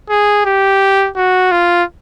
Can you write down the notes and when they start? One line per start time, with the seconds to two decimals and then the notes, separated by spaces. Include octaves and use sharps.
0.10 G#4
0.45 G4
1.16 F#4
1.51 F4